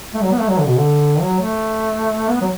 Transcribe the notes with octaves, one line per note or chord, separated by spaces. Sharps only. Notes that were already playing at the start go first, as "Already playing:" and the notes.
A3
F#3
B3
A3
F#3
D3
B2
D3
F#3
A3
B3
F#3